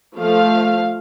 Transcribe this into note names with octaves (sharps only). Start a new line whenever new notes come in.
F3 A3 F5